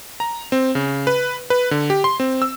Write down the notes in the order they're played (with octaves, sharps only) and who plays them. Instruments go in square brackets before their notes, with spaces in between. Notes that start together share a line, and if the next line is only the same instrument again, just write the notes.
[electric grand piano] A#5
C4
C#3
B4
B4
D3
G4
C6
C4
E6